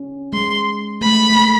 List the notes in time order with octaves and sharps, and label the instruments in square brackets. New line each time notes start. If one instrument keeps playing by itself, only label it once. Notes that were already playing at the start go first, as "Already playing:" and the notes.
Already playing: [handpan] C#4
[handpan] G#3 [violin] C6
[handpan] A3 [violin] B5
[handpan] A3
A#3